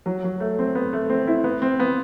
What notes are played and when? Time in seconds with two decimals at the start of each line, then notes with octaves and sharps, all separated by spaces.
0.06 F#3
0.24 F#3
0.40 A3
0.59 C4
0.75 B3
0.93 A3
1.09 C4
1.27 E4
1.44 B3
1.62 C4
1.80 B3